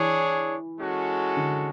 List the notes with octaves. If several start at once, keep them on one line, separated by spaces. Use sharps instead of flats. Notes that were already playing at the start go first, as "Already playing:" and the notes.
Already playing: E3 D4 G#4 C#5
G#3 C#4 F#4 A4
D3